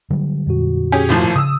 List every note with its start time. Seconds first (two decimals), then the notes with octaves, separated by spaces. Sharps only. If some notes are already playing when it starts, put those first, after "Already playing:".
0.10 D3 F#3 G3
0.47 F2 A#2 F#4
0.92 C#4 G4 G#4
1.09 G#1 A2 F3
1.36 C#3 D#6 E6